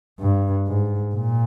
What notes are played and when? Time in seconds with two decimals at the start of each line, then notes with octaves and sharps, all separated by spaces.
0.20 G2
0.67 G#2
1.15 A#2